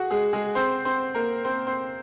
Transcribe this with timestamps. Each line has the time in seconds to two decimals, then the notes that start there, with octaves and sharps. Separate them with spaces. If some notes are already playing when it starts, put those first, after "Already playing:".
Already playing: F#4 G#4 F#5
0.11 G#3 G#4
0.33 G#3 G#4
0.55 C4 C5
0.85 C4 C5
1.15 A#3 A#4
1.45 C4 C5
1.67 C4 C5